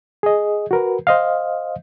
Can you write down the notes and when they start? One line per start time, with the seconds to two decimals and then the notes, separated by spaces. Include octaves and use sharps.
0.23 G#4 D#5
0.71 F#4 A#4 B4
1.07 C5 D#5 F5